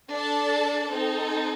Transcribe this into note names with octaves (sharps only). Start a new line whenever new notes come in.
D4 A4 D5 A5
C4 D#4 A4